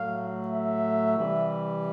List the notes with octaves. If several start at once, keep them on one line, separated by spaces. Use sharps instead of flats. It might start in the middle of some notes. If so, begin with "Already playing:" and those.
Already playing: A2 F#3 A3 F5
E5
C3 E3 G3